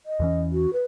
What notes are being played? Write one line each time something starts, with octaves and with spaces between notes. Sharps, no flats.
D#5
E2 E3 C#4
F#4
B4